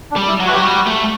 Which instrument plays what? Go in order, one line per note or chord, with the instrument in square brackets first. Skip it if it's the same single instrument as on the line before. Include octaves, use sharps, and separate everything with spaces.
[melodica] D4
[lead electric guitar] G3
[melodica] E4
[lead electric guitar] F#3
[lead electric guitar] E3 [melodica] F#4
[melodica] G4
[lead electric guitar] F#3
[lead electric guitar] G3 [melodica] F#4
[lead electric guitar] A3